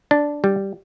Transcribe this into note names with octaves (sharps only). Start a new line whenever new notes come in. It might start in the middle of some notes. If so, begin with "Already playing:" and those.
D4
G3